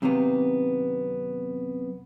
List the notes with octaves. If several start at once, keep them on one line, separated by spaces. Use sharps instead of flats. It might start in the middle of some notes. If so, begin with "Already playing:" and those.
F#2 C3 D#3 A#3 B3